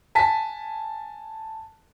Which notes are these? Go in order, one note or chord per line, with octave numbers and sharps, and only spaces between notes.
G#5 A5 B6